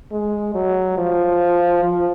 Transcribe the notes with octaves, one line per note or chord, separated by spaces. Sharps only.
G#3
F#3
F3
F3